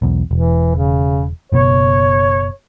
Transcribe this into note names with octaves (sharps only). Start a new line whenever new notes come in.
B1 E2
E1 E3
C#3
F#1 B2 B3 C#5